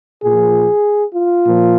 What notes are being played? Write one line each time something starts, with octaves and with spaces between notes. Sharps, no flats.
A#2 F3 G#4
F4
A#2 F3